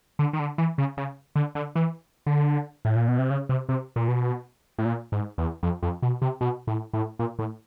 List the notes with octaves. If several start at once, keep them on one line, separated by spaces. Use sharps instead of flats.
D3
D#3
D3
E3
C#3
C#3
D3
D3
E3
D3
A2
A#2
B2
C3
C#3
C3
C3
A#2
B2
A2
A#2
G#2
E2
F2
F2
B2
C3
B2
A2
A2
A#2
A2